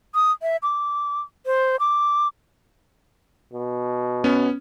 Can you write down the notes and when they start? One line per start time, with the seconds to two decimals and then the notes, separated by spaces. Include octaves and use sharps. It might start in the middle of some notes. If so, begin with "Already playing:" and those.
0.15 D#6
0.42 E5
0.63 D6
1.46 C5
1.80 D6
3.53 B2
4.24 B3 C#4